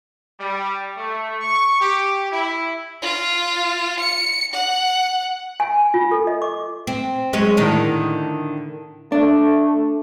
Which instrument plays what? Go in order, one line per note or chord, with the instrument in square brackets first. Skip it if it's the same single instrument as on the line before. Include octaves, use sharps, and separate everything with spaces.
[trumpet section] G3
A3
C#6
G4
E4
[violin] F4
C#7
F#5
[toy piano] G#5
F4
A4
D#5
D6
[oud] C4
F#3 G#3 C#4
A2 D3 D#3
[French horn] A3 [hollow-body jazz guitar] D4